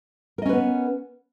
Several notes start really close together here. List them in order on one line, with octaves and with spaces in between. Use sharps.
A#4 D#5 C#4 B4 B3